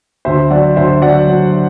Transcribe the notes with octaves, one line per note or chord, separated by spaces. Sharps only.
D2 C5 E5
F#3 D5 F#5
D2 C5 E5
F#3 D5 F#5
F#3